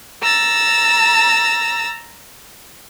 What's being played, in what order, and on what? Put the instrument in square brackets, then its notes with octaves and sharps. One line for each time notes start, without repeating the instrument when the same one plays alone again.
[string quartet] A#5 E6 A6